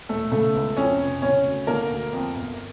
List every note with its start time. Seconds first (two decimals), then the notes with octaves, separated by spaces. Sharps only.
0.09 E1 A3 A4
0.31 C#3 A3 A4
0.55 C#2
0.77 F2 C#4 C#5
1.00 F1
1.22 C#3 C#4 C#5
1.45 D2
1.67 D3 A#3 A#4
1.90 D2
2.13 F2
2.36 G1